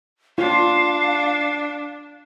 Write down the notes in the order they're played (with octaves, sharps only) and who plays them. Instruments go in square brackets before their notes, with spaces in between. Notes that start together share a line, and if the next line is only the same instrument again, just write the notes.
[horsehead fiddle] D4 [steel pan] F4 [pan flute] F5